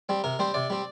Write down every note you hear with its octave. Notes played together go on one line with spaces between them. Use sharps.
G3 C4
C3 A#4
G3 C4 C5
C3 D5
G3 C4